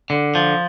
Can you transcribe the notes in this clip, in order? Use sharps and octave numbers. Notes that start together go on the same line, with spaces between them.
D3
F3